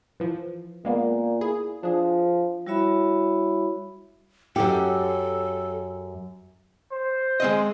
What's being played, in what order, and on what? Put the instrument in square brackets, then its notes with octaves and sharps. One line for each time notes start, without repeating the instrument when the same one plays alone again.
[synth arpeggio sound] E3 F3
[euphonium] A#2 [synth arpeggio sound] G#3 A#3 B3
[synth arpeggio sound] E4 G#4
[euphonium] F3 [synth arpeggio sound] D4 G#4
[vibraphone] G3 E4 F#4 C#5 E5 B5
[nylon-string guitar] F#2 G4 [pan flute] A4
[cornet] C5
[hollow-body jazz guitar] G#3 C4 D#5